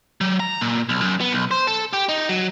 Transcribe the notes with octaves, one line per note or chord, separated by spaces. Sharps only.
F#3
A#5
A#2
B1
F#2
B3
B1
C5
A4
G4
D#4
F#3